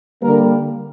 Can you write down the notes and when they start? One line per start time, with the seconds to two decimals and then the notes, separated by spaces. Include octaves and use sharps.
0.22 D3 G3 A#3 A#4